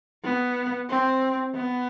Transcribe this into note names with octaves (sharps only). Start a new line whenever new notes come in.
B3
C4
B3